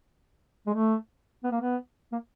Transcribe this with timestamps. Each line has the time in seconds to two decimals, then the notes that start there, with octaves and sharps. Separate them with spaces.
0.67 G#3
0.74 A3
1.44 B3
1.51 A#3
1.61 B3
2.12 A#3